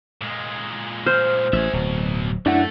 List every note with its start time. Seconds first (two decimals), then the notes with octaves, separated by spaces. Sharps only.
0.21 A#2 G#3
1.06 C5 F6
1.53 A1 G#4 E5
1.73 D1 B2 F#3
2.46 F#2 A3 D4 E4 F#5